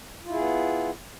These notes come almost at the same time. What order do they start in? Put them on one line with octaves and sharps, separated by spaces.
F4 E4 G#4 B3